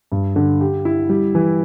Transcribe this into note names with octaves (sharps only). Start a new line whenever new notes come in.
G2
D3
G4
E4
G3
E3